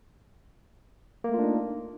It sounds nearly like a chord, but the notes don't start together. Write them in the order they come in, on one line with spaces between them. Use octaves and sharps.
A#3 A3 F4 D4 D#4